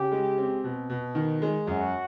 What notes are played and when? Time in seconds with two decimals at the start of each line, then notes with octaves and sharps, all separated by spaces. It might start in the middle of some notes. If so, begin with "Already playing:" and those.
Already playing: C#3 G4
0.12 G#3
0.38 C4
0.64 B2
0.90 B2
1.15 D#3
1.42 G#3
1.67 F#2 F#4